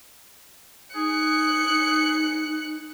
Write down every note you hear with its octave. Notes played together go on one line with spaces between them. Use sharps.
D#4 G#4 F#6 C#7
D#4